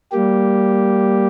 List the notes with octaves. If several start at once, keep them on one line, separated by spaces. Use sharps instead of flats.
G3 A#3 G4